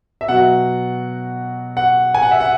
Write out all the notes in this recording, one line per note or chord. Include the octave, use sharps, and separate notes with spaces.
E5
B2 F#3 F#5
F#5
G#5
F#5
E5
F#5